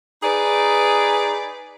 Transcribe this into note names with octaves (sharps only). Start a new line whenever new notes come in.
D#4 G#4 B4 D5